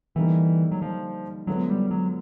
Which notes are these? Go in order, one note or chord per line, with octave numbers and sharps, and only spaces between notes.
D3 E3 G3 A#3 D#4
F#3
F3
F#2 D3 F3 F#3 G#3 B3
G3
F#3